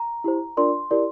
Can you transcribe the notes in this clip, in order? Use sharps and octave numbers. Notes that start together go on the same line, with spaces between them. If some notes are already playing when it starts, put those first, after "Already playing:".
Already playing: A#5
E4 G4 C5
D4 F4 A#4 D5 C6
E4 G4 A#4 D5